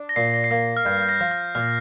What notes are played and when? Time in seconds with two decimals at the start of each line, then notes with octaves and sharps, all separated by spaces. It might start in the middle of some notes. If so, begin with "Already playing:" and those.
Already playing: D4
0.09 A#6
0.16 A#2 C7
0.34 A#6
0.44 C7
0.51 A#3 A#6
0.77 F6
0.85 G2 G6
1.02 G6
1.09 A#6
1.20 F3
1.32 F6
1.55 A#2 F6